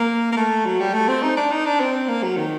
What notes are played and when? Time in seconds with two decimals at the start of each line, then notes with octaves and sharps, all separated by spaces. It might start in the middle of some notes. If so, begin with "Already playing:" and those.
Already playing: A#3
0.33 A#3
0.37 A3
0.66 F#3
0.80 G3
0.94 A3
1.08 C4
1.23 D#4
1.37 D4
1.51 D#4
1.66 D4
1.80 C4
2.09 A#3
2.23 F#3
2.37 D#3